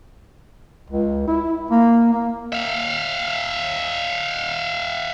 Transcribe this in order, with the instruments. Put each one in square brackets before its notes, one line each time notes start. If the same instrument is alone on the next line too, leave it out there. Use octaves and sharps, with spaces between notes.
[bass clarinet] C#2
E4
A#3
A#3
[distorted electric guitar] E5 F5